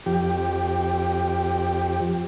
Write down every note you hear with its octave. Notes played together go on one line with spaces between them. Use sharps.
F2 G4